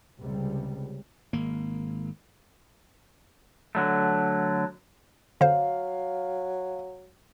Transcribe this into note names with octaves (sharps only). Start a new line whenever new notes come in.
C#2 C3 G3
G#1 A#3
D3 F#3 A3
D3 F#3 C5 F5